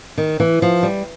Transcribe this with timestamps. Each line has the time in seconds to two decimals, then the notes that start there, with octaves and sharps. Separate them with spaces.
0.18 D#3
0.40 E3
0.62 F3
0.83 G3